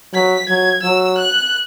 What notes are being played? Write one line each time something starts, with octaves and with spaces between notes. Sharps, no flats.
F#3 B6
F#3 G#6
F#3 E6
F#6